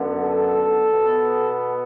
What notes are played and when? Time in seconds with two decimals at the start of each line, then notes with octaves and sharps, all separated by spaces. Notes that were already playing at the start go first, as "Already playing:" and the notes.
Already playing: F#2 D3 B3
0.21 A4
0.91 B2 B3